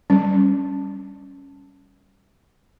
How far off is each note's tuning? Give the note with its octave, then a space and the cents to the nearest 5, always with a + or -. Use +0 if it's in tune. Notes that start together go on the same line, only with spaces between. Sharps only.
G3 +0 C#4 +0